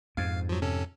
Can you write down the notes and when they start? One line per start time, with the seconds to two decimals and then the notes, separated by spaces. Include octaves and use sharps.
0.17 F2 G#2 F5
0.49 F3 F#3
0.62 C3 C#4 A4